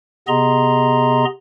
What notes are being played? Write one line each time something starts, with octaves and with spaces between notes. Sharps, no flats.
C3 B3 G#4 D#5 A#5 C6